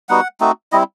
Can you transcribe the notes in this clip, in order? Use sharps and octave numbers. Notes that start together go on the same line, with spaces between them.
G3 B3 D#4 F#4 F#5
A3 C4 D#4 F#4
G3 C4 E4 D#5